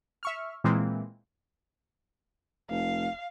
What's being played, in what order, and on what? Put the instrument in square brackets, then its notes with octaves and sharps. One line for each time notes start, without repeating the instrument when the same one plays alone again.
[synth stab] E5 C#6 F6
A#2 E3 G#3 A#3 C4
[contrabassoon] F1 [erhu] F5